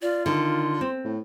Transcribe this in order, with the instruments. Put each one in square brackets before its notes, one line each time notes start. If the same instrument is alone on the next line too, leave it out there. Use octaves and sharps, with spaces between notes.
[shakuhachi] F4 [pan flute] D5
[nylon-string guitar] D3 [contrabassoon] D#3 [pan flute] C6
[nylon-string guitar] C4
[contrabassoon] A2